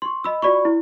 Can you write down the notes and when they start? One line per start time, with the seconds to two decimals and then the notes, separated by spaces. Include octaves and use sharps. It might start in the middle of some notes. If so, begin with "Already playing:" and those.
0.02 C6 C#6
0.24 D#5 B5 E6
0.42 F4 F#4 D5 B5 C#6
0.65 E4